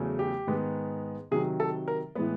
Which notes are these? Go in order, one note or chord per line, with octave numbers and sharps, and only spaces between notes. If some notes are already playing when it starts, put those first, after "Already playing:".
Already playing: E2 C#3 F#3 A3
G4
G#2 D#3 G#3 B3
C3 D#3 F#3 G#4
A4
A#4
A2 E3 G#3 B3 B4